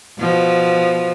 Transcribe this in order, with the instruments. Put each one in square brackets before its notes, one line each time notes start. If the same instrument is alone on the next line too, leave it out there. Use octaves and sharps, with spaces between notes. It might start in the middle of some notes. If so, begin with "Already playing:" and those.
[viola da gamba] B2 F3